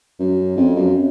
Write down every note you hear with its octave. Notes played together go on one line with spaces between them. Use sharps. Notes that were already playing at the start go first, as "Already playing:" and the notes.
F#2
F2
F#2